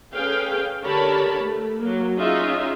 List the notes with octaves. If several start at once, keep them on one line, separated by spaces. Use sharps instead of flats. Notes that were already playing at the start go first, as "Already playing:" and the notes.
C#4 G#4 A4 B4 F5 G5
D3 G4 A#4 C#5 A5 B5
A3
F#3 A#3
C#4 D#4 F4 G#4 E5